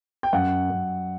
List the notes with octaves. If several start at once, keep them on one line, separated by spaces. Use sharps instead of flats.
G5
F#2 F#5
F#2